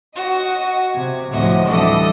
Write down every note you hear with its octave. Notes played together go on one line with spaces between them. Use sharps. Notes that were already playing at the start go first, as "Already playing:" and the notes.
F#4 D#5
C3 G#6
D2 A2 C3 F3 F#4 D#5
E3 G3 D4 A4 D#5 D#6